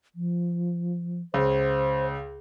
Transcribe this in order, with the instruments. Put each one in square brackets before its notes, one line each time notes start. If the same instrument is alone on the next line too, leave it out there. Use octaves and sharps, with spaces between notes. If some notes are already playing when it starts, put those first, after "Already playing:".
[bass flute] F3
[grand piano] C#2 [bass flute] C5